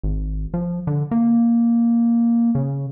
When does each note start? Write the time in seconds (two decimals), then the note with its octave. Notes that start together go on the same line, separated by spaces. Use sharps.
0.03 G#1
0.54 F3
0.87 D3
1.11 A#3
2.55 C#3